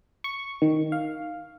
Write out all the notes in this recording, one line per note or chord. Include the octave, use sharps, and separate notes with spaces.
C#6
D#3
F5